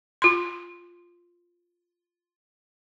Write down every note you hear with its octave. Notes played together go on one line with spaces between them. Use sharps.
F4 C6